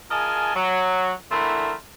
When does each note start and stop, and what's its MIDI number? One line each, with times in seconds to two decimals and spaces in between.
0.11 0.54 65
0.11 0.54 68
0.11 0.54 70
0.11 0.54 75
0.11 0.54 80
0.11 0.54 81
0.55 1.12 54
1.32 1.73 50
1.32 1.73 52
1.32 1.73 57
1.32 1.73 60
1.32 1.73 64
1.32 1.73 70